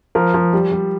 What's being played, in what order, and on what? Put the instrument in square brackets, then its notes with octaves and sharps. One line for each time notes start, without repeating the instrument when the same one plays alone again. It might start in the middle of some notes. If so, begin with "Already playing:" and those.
[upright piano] F3 A#4
F3
G3
G3